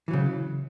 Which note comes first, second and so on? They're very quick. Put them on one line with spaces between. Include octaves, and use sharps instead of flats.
E3 F#3 C#3